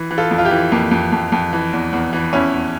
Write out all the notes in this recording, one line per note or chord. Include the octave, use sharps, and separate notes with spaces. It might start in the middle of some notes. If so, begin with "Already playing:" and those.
Already playing: E3
E3
F4 A4
F2
F4
E4 G4
E3
F2 A#3
F2
F2
F2
E3
E2
E2
E3
E2 C#4 E4
E2